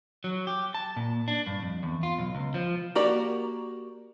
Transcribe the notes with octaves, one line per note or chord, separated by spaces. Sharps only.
F#3
G4
A5
A#2
D4
G2
F2
E2
F4
B1
C#2
F3
A#3 F#4 G4 D5 A#5